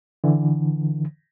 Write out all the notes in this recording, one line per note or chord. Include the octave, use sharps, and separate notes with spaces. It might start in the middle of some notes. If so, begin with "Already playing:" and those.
D3 E3